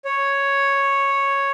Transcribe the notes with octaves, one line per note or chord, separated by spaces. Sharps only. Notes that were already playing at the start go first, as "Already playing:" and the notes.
C#5